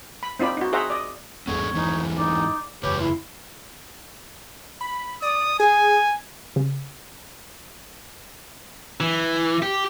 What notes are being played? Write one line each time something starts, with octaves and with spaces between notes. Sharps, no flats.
B5
C4 D#4 F4 D5 B5
D#4 F#4
G#4 C5 D#5 E5 F#5 A#5
D5 D#5
G#1 E2 G2 B3 G#4 A4 C#5
G#2 E3 D#4
D#4 D5
F#1 E2 C#3 G4 B4 C#5
E4 C6
B5
D5 D#6
G#4 G#5
C#3
E3
G4